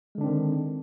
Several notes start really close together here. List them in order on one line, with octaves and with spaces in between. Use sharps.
G#3 D3 D4 C4 D#3